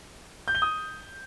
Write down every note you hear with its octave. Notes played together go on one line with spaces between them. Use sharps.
G6
G7
D#6